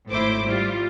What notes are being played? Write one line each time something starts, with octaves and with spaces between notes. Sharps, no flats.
G#1 A2 E4 C5 D6
G3 F4